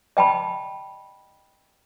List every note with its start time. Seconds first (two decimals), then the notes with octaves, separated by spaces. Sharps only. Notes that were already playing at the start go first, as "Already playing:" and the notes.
0.17 D#5 G5 A5 B5